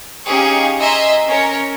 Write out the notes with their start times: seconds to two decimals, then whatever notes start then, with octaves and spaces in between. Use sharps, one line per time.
0.25 C#4 D#4 G4 G#4 F5 C#6
0.80 D#5 E5 G#5 A#5 C6 E6
1.28 C#4 A#4 C#5